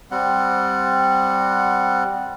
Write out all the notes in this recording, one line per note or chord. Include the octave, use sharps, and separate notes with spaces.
G3 C4 F#5